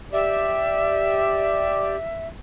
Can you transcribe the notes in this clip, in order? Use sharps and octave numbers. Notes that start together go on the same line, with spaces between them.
G4 D5 E5